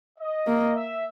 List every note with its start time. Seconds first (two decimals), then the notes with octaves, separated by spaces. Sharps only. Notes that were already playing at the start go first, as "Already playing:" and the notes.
0.19 D#5
0.47 A#3
0.75 E5